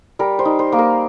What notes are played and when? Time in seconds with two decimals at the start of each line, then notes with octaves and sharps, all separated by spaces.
0.19 G3 A#4
0.39 C5
0.45 D#4
0.59 C5
0.72 A#3
0.79 A#4